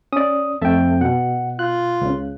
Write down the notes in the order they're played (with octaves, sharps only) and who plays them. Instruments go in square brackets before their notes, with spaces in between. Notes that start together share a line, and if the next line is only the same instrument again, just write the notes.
[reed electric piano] C#4 D5 [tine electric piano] D#6
[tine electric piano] F2 G5 [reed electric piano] A3 E5 A5
[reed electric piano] B2 [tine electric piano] F#5
[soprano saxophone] F4 [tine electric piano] F#6
[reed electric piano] C#2 C#3